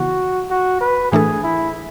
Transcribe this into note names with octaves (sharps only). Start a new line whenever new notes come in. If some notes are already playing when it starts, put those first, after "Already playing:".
Already playing: C#3 E3 B3 E4 F#4
F#4
B4
A2 E3 A3 D4 G#4 A4
E4